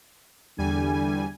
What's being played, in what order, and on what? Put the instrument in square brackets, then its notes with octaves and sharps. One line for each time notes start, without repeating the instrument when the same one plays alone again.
[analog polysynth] E2 G3 G#5 [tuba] D3